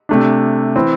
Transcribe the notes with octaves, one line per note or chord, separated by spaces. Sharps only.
C3 A3 D4
E3 C4